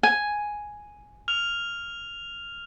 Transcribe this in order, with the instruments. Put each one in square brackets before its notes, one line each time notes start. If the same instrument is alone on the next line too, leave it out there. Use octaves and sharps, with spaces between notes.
[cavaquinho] G#5
[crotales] F6 F7